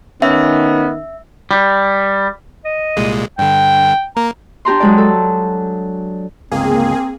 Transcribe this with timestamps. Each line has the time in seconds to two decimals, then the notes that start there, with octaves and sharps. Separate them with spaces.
0.22 D#3 B3 C#4 E5
1.51 G3
2.64 D#5
2.96 C2 A#2 G#3
3.38 G2 D3 G5
4.16 A#3 A#5
4.65 D4 G4 A#5 C6
4.80 F#3 G#3 D5
4.98 A4
6.51 G1 C#2 A#3 C4 G#4